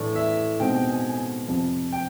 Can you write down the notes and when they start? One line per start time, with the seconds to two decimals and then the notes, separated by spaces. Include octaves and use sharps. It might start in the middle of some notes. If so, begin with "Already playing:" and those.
Already playing: A2 E3 A3 D4
0.15 E5
0.60 B2 G#3 C4 D#4 G5
0.75 G5
0.89 G#5
1.09 G#5
1.48 F2 C3 F3
1.92 G5